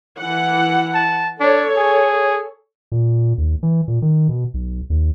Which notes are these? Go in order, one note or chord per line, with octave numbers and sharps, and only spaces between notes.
E3 F#5
A5
D4 A4 C#5
G#4
A#2
D#2
E3
A#2
D#3
B2
B1
D#2